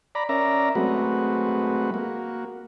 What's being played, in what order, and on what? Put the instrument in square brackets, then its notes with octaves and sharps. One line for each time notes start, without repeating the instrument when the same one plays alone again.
[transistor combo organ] D5 A#5 B5
C#4 A#4 D5 E5 A#5
F#3 G#3 A3 C4 F#4 B4
A#3 F#4